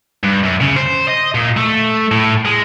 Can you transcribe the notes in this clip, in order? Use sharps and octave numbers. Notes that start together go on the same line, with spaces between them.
G2
F#2
C#3
C5
D#5
A#2
A3
A2
G#3